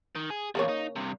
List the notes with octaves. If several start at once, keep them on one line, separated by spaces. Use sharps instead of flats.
D#3
G#4
E2 A#2 C#3 A#3 C#5
D#4
G2 C3